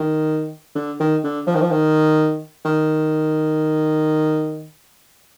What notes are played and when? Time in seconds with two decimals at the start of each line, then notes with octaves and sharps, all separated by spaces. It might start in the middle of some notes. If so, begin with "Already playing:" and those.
Already playing: D#3
0.75 D3
1.00 D#3
1.24 D3
1.47 F3
1.55 D#3
1.62 F3
1.71 D#3
2.65 D#3